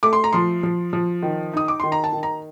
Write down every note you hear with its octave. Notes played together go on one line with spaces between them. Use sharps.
A3 D6
C6
A#5
F3 C6
F3
F3
D#3
D#4 D#6
D6
D#3 C6
A#5
A5
D#3
A#5